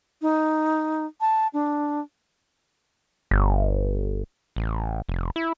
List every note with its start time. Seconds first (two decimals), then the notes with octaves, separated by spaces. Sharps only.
0.22 D#4
1.21 A5
1.54 D4
3.31 G1
4.56 A1
5.09 F1
5.36 E4